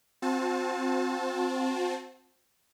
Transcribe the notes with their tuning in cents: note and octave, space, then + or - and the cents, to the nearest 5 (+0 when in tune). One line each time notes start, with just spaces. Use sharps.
C4 +0 F#4 -45 A5 -15